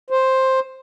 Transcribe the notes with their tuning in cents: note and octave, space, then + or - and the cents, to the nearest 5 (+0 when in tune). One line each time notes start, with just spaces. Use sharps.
C5 +5